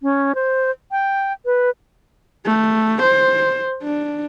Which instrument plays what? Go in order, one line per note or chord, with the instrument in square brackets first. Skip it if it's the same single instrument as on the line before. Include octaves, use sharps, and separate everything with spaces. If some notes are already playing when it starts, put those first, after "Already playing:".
[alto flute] C#4
C5
G5
B4
[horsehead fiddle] A3
C5
D4